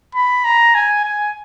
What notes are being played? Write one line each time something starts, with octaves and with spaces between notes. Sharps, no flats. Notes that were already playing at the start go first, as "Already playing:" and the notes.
B5
A#5
G#5
G#5